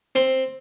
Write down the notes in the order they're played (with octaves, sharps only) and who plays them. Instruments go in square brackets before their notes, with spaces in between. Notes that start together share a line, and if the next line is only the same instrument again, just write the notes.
[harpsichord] C4